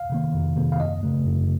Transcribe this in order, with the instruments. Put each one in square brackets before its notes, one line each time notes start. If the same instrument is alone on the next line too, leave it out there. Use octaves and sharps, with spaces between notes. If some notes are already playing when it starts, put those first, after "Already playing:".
Already playing: [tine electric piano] F5
C3 D#3 A#3
F2
C3 D#3 A#3
F5
F#2 D#5
C#3 A3
F#2